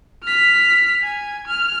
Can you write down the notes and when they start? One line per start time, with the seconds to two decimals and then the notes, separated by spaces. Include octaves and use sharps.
0.24 F6 B6
1.02 G#5
1.47 F6